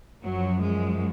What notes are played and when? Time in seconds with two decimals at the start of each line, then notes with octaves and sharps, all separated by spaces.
0.23 F#2 F3 F#3
0.60 G#3